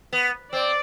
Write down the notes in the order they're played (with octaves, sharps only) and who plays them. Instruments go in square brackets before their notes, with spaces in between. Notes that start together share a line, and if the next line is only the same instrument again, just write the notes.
[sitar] B3
[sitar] C4 [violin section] D5